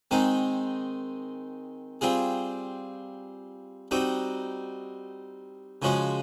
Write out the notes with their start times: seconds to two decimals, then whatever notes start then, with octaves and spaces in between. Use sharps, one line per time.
0.11 D#3 G#3 C4 D#4
2.01 G3 C4 F4 G#4
3.91 G3 C4 D#4 F#4
5.82 C#3 F3 G#3 C#4 F#4